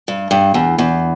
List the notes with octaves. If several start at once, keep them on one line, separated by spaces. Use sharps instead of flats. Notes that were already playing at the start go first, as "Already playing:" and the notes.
G2
G2
E2
E2